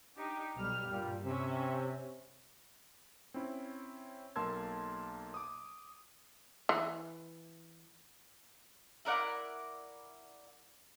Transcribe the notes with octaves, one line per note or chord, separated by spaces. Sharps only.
D4 D#4 G4
B1 G3 F6
G2 A#2 G3
C3 C#4 E5
C4 C#4 E4
B1 A#3 A5 C6 E6 G#6
D6 D#6
E3
E4 A#4 D5 F#5